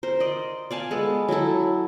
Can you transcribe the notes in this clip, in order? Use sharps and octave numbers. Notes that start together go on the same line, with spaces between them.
A#4 C5
D5 D#5
D5 F5 G#5 A5
G#3 B3 A4
F#3 C#4 E4 A4